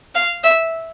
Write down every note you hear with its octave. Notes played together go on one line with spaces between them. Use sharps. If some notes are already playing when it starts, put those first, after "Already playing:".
F5
E5